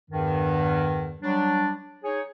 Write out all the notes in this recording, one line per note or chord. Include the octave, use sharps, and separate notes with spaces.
E2 G2 D#3
F#3 G3 D4
D#4 G#4 C#5